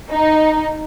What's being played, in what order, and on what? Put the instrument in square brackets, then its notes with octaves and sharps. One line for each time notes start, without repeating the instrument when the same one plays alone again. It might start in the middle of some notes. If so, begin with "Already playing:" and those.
[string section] D#4